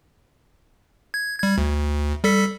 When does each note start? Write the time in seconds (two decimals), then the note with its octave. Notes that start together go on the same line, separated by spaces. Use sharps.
1.14 G#6
1.40 G3 G#6
1.58 D2
2.24 G3 A4 B6